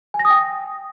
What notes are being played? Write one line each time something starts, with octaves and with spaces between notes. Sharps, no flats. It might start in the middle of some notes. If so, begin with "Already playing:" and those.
G#5
A#6
D#6
G5